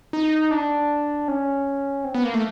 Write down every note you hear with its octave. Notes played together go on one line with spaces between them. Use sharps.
D#4
D4
C#4
C4
B3
A#3
A3